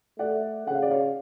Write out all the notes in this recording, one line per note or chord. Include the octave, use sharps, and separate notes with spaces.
A3 D5 F#5
C#3 F#5
F5
D5
C#5 F5